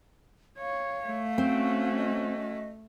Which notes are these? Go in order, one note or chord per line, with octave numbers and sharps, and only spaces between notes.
C#5 F5
A3
C4 C#4 F#4
D#5